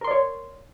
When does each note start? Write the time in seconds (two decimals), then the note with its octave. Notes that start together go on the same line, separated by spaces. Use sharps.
0.01 A#4
0.04 C6
0.08 D5
0.11 C#5